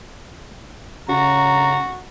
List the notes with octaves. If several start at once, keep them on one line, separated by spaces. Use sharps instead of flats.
C#3 C#4 F#4 A#5